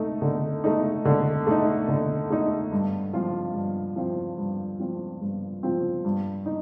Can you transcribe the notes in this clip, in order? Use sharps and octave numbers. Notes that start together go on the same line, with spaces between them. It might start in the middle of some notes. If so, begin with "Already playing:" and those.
Already playing: A3 D#4
D3
A3 D#4
D3
A3 D#4
D3
A3 D#4
G2
F3 C4 F4
G2
F3 C4 F4
G2
F3 C4 F4
G2
F3 C4 F4
G2
D#4